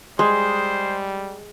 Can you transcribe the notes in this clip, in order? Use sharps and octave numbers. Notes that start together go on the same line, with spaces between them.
G3 G#3 C5 C6